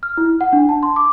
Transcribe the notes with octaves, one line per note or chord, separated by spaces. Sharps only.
F6
E4
F#5
D4
A5
C6
D6